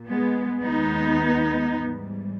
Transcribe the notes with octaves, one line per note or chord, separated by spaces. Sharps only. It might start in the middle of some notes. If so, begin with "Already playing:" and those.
Already playing: A#2
G#3 B3
D#2 D#3 G#3 B3 D#4
G#2 E3 G3